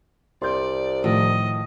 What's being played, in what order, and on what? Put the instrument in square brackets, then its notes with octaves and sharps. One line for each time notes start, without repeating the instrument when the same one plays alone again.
[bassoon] C2 [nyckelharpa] D5 [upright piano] C6 G6
[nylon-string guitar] A2 [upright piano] D#3 F3 [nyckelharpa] D#5